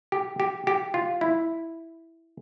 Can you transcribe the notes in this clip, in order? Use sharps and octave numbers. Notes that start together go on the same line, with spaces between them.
G4
G4
G4
F4
E4